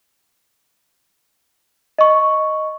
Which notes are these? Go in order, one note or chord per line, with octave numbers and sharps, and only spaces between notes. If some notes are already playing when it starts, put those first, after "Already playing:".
D#5 C#6